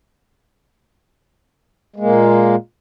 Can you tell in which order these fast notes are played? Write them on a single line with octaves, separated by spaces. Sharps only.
G#3 A#3 A#2